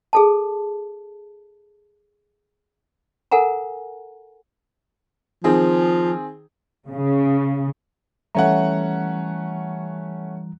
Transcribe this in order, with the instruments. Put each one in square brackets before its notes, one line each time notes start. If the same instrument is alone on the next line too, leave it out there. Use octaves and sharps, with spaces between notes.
[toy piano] G#4 A4 A5
A4 A#4 F#5 G#5 A#5
[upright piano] D#3 C4 G#4 [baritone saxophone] F3
[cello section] C#3
[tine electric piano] E3 G3 A#5 [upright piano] A3 C#4 F#5